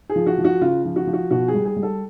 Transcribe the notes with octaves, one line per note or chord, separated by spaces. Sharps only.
G#4
F3
F#4
F3
F#4
C#3 F4
F3
F#4
F3
F#4
B2 F#4
G#4
G3
G#4
G3
A4